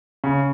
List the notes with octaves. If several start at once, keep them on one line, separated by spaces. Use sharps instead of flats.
C#3